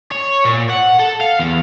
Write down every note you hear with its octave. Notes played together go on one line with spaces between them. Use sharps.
C#5
A#2
F#5
A4
F5
E2